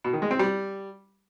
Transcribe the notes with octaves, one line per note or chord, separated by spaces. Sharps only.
B2
D#3
G#3
C4
G3